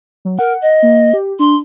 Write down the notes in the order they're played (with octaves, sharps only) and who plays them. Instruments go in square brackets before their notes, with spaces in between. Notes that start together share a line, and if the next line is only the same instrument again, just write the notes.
[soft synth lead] F#3
[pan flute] A#4 [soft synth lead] F#5
[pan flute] D#5
[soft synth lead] A#3
G4
[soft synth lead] D4 [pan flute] C6